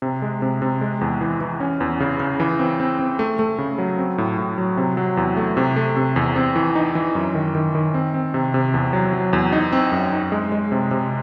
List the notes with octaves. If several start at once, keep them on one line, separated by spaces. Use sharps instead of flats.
C3
G#3
C3
C3
G#3
E2
E3
E3
C#4
E2
C#3
C#3
E3
C4
C4
C4
A3
A3
C#3
F#3
C4
A2
A2
F#3
C3
F#3
E2
A3
C3
A3
C3
E2
C4
E3
D#4
E3
F#2
D#3
D#3
D#3
C4
C4
C3
C3
E2
F#3
F#3
E2
D#4
C4
F#2
D#4
G#3
G#3
C3
C3